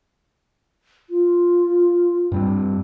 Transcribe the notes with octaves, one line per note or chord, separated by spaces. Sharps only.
F4
G2 G3 C4